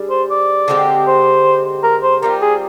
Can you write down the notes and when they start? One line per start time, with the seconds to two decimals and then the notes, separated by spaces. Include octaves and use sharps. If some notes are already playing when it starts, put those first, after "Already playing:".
Already playing: G3 D4 G#4
0.10 C5
0.30 D5
0.68 D3 G#3 C4 G4
1.07 C5
1.83 A#4
2.03 C5
2.22 G3 C4 F4 A#4
2.42 G#4